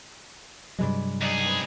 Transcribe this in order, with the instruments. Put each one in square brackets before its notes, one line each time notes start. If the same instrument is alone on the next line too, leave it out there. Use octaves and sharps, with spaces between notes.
[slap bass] G2 C3 F#3 [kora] G#3 B4 D5
[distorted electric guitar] C#2 G#4 [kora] D4 D#4 D5
[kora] C4 B4